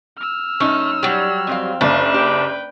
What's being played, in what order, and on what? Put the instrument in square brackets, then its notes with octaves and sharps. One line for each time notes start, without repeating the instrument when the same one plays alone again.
[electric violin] E6 F6
[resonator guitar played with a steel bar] F#2 C#4 D#4 [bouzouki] A3
[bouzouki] F#3 G3
[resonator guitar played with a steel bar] F2 C4 F5
[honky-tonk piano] F#1 [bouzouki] D4
[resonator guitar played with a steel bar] G4 [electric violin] B4 G5